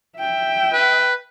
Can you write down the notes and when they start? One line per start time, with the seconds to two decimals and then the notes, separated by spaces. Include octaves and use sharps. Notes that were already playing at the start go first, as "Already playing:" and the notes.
0.19 E5 G5
0.73 B4